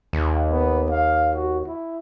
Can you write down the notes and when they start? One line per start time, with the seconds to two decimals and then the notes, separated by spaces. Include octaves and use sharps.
0.13 D#2
0.51 B3
0.90 F5
1.34 F#4
1.68 E4